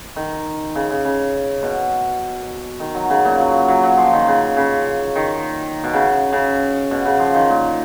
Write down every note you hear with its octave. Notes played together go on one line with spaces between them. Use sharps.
D#3
C#3
C#3
C#3
B2
D#3
F#3
C#3
A#2
F#3
F#3
F#3
F3
D#3
C#3
C#3
D#3
B2
C#3
C#3
B2
C#3
F3
D#3
A#2